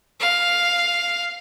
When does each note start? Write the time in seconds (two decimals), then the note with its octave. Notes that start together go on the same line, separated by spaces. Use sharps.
0.20 F5